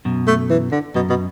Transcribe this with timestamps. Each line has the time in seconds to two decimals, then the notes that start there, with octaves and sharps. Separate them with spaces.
0.05 F#2 B2
0.27 A3
0.50 E3
0.72 D3
0.95 F#2 B2
1.09 B2